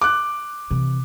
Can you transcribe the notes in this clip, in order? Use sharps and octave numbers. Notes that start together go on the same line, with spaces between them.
D6 F#6
C3 E3